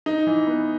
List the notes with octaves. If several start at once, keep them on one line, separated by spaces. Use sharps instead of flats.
D#4
E3
B3